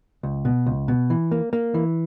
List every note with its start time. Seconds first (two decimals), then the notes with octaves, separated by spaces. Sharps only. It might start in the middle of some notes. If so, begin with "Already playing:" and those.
0.23 C#2
0.45 B2
0.66 C#2
0.88 B2
1.10 E3
1.31 A#3
1.53 A#3
1.74 E3